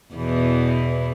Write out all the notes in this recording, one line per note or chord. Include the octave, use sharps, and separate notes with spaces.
E2 B2 E3